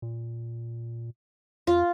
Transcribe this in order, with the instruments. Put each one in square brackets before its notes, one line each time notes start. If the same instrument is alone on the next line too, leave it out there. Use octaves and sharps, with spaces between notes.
[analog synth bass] A#2
[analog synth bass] F2 [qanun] F4